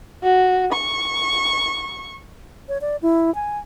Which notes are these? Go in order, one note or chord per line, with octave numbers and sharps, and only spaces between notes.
F#4
C#6
C#5
D5
E4
G#5